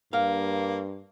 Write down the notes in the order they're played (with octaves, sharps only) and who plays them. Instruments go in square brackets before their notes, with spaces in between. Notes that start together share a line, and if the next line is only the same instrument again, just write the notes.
[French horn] G2 [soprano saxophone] A#3 [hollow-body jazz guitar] F5